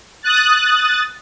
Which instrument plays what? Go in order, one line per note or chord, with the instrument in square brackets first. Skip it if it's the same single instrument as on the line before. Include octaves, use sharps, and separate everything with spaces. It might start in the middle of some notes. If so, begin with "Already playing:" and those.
[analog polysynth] D#6 F#6 A6